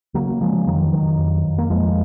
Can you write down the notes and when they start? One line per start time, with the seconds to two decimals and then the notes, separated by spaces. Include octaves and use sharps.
0.14 C#3 F#3 A#3
0.40 C#3 F3 G#3
0.67 F2 D#3 F#3
0.92 F2 D#3 F#3
1.18 F2
1.45 F2
1.58 A#3
1.70 F2 F3 G#3